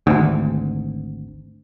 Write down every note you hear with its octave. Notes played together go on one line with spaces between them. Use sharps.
G#1 D2